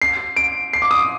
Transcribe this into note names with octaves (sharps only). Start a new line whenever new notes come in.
C7
D7
C7
D6
D#6